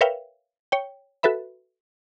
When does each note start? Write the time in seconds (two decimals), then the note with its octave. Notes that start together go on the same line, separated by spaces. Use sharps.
0.01 A#4 B4 C#5 E5 F5 G5
0.72 C#5 G5
1.23 F#4 A4 B4 E5 B5